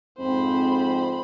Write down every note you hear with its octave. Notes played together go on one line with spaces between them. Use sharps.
F2 G#2 C4 C5 B5